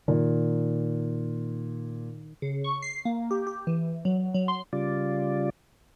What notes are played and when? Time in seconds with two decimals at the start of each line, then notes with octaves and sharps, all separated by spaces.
0.08 A#2 D#3
2.42 C#3
2.64 C#6
2.82 C7
3.05 A#3
3.31 G4
3.47 G4
3.67 E3
4.05 F#3
4.34 F#3
4.48 C6
4.73 C#3 G3 F4 D5